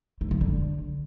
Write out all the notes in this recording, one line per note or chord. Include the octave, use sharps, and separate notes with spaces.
A3
F3
D3